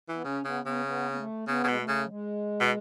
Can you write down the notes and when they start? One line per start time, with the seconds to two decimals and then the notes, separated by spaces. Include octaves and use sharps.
0.08 E3
0.15 B3
0.24 C#3 C#4
0.44 C#3 B3
0.65 C#3 B3
0.86 B3
1.11 B3
1.17 A3
1.47 C#3 B3
1.64 C#3
1.67 B2 G#3
1.78 A3
1.88 C#3
2.04 F#3
2.09 G#3
2.60 B2